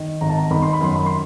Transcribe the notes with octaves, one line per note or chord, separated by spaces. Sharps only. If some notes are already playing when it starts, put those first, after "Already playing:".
Already playing: D#3
G#1 A#5
A5
A#5
D#3 B5
C6
B5
F#2 C6
B5
C6